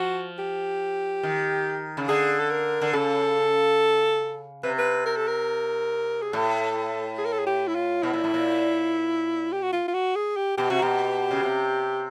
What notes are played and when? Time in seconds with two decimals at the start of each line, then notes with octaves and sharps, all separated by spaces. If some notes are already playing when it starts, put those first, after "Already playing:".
Already playing: F3 F#4
0.39 G4
1.23 D#3
1.97 C#3
2.09 D3 G#4
2.40 A4
2.51 A#4
2.82 D3
2.93 C#3 A4
4.63 C3 B4
4.79 B4
5.06 A#4
5.17 A4
5.28 A#4
6.22 G#4
6.33 A2 A4
7.18 G#4
7.26 A#4
7.33 A4
7.39 G#4
7.47 G4
7.68 E4
7.75 F4
8.03 B2 E4
8.13 A#2
8.24 A2
8.34 A#2
9.53 G4
9.63 F#4
9.73 F4
9.88 F4
9.94 F#4
10.16 G#4
10.37 G4
10.58 B2 G4
10.70 C3 F#4
10.82 B2 G4
11.31 C#3
11.43 C3